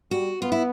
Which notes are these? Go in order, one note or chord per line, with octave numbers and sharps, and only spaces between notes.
G3 F#4
B3 F4
E4